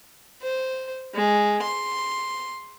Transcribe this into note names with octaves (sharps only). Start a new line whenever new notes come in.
C5
G#3
C6